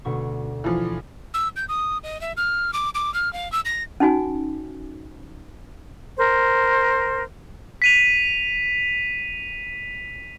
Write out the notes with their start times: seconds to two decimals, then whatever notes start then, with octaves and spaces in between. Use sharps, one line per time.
0.05 D2 B2 C#6
0.64 E3 F3
1.34 E6
1.56 G6
1.69 D#6
2.03 D#5
2.21 E5
2.37 F6
2.73 D6
2.95 D6
3.14 F6
3.33 F5
3.52 E6
3.65 A#6
4.00 C#4 D#4 F#4 G#5
6.17 A#4 C5
7.82 B6 D#7 F7